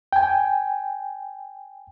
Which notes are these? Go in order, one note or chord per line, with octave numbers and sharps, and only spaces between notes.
G5 G#5